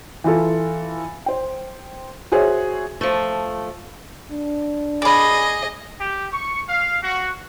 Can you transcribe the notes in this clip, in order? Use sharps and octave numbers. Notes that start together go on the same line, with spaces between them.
E3 E4 F4 A4
C5 G5
F#4 G#4 C5 C#5 E5
F3 A3
D4
G#4 D5 D#5 B5
G4
C#6
F5
F#4